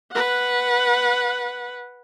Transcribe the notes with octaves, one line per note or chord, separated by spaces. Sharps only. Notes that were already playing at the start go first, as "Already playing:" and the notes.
B4 F#5